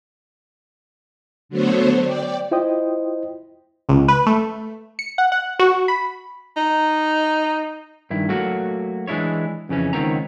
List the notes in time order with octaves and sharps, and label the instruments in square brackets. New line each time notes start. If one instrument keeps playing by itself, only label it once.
[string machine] D3 F#3 A3 B3 C5 C#5
D5 G5
[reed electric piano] E4 F4 C5 D#5 G5 D#6
[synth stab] C#2
B4
A3
C#7
F#5
F#5
F#4
B5
[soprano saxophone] D#4
[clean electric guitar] G2 D#3 E4
F#3 A3 A#3 F#4
E3 G#3 D4 E4 C#5
F2 C#3 E3 C#4
C#2 D#3 B3 C4 C#5 A#5